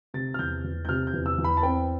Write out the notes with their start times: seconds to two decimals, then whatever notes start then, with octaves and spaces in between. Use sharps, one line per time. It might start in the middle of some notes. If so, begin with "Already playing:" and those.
0.14 C3 A6
0.34 F6
0.39 E2 G6
0.64 E2
0.85 G6
0.89 C3 F6
1.07 G6
1.13 E2
1.26 E6
1.38 E2
1.44 B5
1.57 A5
1.63 C4 G5